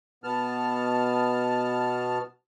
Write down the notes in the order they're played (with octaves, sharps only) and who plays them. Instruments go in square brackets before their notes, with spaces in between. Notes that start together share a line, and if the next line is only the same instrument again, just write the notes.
[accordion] B2 B3 A5 F6